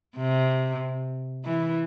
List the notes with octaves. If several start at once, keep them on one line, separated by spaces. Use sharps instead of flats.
C3
E3